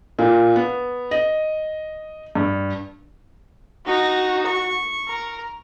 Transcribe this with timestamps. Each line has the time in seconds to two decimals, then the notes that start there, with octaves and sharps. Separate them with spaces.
0.19 A#2
0.56 B3
1.11 D#5
2.35 G2
3.86 D#4 F#4
4.46 C#6
5.08 A#4